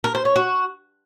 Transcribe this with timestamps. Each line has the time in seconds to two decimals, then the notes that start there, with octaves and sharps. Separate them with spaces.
0.04 A#4
0.15 C5
0.25 C#5
0.36 F#4